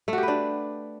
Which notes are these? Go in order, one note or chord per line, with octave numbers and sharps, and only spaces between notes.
A3
F#4
G4
B4
D4